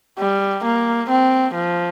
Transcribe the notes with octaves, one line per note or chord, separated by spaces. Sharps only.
G3
A#3
C4
F3